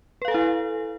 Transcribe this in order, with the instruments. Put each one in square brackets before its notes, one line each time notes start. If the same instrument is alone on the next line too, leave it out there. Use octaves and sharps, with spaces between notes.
[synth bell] B4
F5
A4
G#5
E4